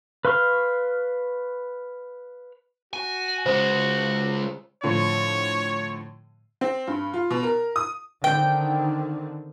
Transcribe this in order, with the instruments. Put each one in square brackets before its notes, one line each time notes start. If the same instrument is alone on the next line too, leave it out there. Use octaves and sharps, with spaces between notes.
[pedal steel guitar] B4 F5 C6 C#6 F6
[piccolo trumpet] F#4 [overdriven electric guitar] G#5
[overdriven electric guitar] C#3 G#3 [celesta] C5
[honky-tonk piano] A2 D3 F3 [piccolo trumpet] C#5
[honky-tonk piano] C4
G2
F4
B2
A#4
D#6
[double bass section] D3 D#3 C4 [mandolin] G5